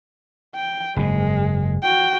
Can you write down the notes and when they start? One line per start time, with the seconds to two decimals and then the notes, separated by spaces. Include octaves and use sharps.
0.55 G5
0.96 F#1 G#2 G#3
1.83 F#4 G5